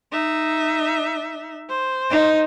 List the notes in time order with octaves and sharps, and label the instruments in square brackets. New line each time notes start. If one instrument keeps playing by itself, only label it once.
[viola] D#4 E5
C5
[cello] D#4